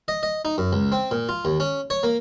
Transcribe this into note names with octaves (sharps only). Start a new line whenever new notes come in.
D#5
D#5
D#4
F#2
C#2
C4
A#2
F4
D#2
C#4
C#5
A#3